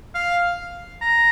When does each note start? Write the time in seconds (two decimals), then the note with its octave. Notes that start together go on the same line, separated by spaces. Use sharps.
0.14 F5
1.02 A#5